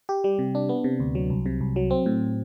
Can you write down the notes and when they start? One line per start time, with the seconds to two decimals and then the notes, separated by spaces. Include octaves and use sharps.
0.09 G4
0.24 G3
0.39 C3
0.55 D4
0.69 B3
0.84 C3
1.00 D2
1.15 F#3
1.30 C2
1.46 C3
1.61 C2
1.76 F#3
1.91 C4
2.06 A2